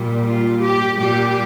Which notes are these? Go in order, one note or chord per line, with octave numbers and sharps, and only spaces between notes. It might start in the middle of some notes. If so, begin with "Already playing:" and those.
Already playing: A#2 G3
F4
G4
A#2 G3 G4